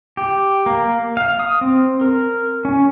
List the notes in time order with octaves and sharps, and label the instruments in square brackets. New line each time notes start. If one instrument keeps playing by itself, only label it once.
[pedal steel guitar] G4
A#3
F5
D#6
C4
A#4
C#4